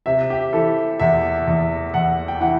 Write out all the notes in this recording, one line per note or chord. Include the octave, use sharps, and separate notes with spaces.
C3 E5
G4
E3 A4
E2 E5
E2
E2 F#5
G5
E3 F#5